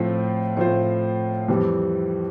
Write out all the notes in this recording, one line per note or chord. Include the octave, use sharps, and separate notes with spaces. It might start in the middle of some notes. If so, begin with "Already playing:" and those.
Already playing: A2 F3 C4 F4 C5
A2 F3 C4 F4 C5
F2 E3 G3 C4